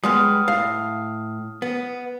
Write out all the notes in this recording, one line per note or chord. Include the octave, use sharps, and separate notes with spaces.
G3 G#3 B3 D#6 F6
A2 F5
B3